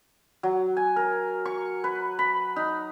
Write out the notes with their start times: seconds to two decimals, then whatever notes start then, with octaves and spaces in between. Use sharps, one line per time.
0.43 F#3
0.77 G#5
0.96 A#4
1.45 C#6
1.84 B4
2.19 B5
2.56 D#4